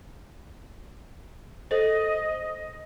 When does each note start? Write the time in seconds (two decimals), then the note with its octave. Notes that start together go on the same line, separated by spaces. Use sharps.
1.71 A4 C5 D#5